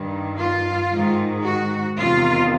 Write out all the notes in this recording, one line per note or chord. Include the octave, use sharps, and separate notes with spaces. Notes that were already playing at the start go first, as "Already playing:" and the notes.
Already playing: G2 D#3
F4
G#2 D#3
F#4
E2 C3 D#3 F4